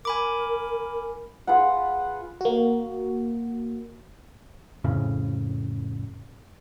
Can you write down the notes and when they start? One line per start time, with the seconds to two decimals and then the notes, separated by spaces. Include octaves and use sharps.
0.05 A#4 G#5 B5 D6
1.47 F4 G#4 B4 F#5
2.41 A#3 F#4
4.84 F2 A2 C#3